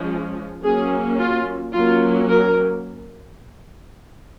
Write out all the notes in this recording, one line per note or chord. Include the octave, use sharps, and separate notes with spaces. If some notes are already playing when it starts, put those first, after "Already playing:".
Already playing: F3 G#3 C#4
F#3 A#3 C#4 G#4
F4
F#3 A#3 C#4 F4
A#4